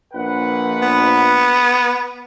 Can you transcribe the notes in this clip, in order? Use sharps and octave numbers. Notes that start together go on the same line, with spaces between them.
A#1 B4 F#5
B3